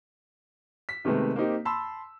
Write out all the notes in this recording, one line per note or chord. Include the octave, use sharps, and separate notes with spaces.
B6
C3 D#3 G#3 A3 B3
A#3 C4 D#4 G4
A5 B5 C6 E6